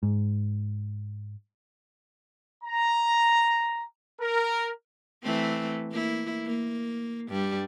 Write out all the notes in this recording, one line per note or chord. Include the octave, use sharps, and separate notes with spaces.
G#2
A#5
A#4
E3 A3 C4
A#3 E4
A#3
G2 G3